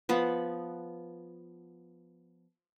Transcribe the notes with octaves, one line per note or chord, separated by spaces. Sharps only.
F3 B3 F#5